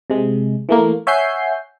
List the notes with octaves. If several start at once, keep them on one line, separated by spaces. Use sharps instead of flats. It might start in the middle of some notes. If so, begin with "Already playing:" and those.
C3 G#3
E3 A3 A#3
C#5 E5 F#5 G#5 G6 C7